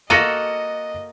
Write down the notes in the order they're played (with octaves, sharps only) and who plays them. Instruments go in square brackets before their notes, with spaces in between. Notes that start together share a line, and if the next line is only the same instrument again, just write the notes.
[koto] A#3 F#4 A4 [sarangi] D#5 [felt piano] A#6 C#7 D#7